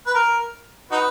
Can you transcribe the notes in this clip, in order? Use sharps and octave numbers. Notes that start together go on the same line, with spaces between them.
B4
A#4
D#4 F#4 B4